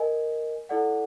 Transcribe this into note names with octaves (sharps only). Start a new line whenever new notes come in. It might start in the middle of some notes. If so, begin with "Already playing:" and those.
Already playing: A#4 D#5 G#5
E4 A4 D5 F#5